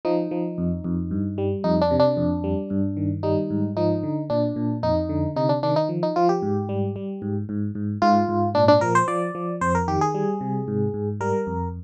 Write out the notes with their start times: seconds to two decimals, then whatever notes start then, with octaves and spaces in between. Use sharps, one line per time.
0.05 F3 D#4
0.31 F3
0.58 F2
0.84 F2
1.11 G2
1.38 G3
1.64 F2 D#4
1.81 D4
1.91 C3
2.00 D4
2.17 F2
2.44 G3
2.70 G2
2.97 D#3
3.23 G3 D#4
3.50 G#2
3.77 F3 D#4
4.03 D3
4.30 A#2 D4
4.56 A#2
4.83 F2 D#4
5.09 D3
5.36 C3 D#4
5.49 D4
5.63 D#3 D4
5.76 D#4
5.89 F3
6.03 D#4
6.16 F3 F4
6.29 G4
6.42 G#2
6.69 G3
6.96 G3
7.22 G#2
7.49 G#2
7.75 G#2
8.02 G#2 F4
8.29 G#2
8.55 A#2 D4
8.68 D4
8.81 F3 A#4
8.95 C5
9.08 F3 D5
9.35 F3
9.61 F2 C5
9.75 A#4
9.88 D#3 G4
10.01 G#4
10.15 G3
10.41 C3
10.68 G#2
10.94 G#2
11.21 G3 A#4
11.47 F2